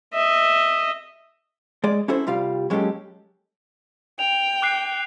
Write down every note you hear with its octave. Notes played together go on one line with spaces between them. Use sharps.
D#5 E5
G#3 G#4 D5
C#4 E4 F#4 A4 C5
C2 G3 F4 F5
F#3 G#3 A#3 C#4 G4 A4
G5 F7
D6 F#6 C7